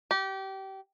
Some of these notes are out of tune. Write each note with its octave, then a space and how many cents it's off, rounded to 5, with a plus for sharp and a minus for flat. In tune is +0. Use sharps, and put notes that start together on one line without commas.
G4 -25